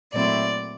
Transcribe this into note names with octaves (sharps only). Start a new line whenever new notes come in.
A#2 F#3 A3 C4 E4 D5